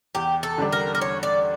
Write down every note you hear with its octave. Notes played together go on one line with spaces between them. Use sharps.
E2 G4
A4
D3 G3 D4
A#4
A#4
E2 C#5
D5